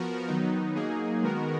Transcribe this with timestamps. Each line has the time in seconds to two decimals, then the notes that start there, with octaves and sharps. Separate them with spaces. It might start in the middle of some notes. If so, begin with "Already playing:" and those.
Already playing: F3 B3 F#4 A#4
0.28 D#3 F#3 B3 D#4
0.75 F#3 A#3 D#4 G#4
1.22 D#3 G#3 B3 F#4 A#4